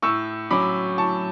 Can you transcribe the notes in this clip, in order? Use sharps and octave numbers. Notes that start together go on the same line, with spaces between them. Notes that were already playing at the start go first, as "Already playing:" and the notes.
A2 C#6 E6
F#3 C#4 B5 D6
A2 A5 C#6